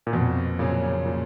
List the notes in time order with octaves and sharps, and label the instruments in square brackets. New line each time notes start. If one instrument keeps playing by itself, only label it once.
[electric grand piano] A#2
[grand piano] F2 [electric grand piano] B2
[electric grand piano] A#2 [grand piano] C#3 F#3 C#4
[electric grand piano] A#2